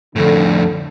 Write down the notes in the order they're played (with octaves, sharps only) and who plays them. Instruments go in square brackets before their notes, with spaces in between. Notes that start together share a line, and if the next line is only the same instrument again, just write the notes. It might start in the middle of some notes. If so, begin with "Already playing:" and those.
[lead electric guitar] F2 A2 [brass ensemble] D3